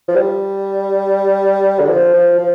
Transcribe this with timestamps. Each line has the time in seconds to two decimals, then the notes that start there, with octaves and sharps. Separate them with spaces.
0.08 F3
0.15 G3
1.80 D3
1.89 F3
2.14 F3
2.38 F3